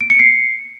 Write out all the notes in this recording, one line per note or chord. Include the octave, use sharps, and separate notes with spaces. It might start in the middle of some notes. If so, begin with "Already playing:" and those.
D7
C#7
C7